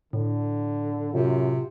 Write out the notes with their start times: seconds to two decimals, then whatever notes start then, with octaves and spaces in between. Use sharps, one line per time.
0.13 A2 D3
1.14 F#2 C3 F4